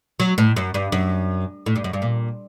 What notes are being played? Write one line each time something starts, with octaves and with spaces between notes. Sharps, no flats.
F#3
A2
F#2
G2
F#2
A2
G2
F#2
G2
A#2